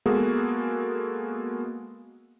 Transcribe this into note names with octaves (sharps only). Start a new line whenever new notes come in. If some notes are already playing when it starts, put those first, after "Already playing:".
G#3 A#3 B3 F#4 G#4 A4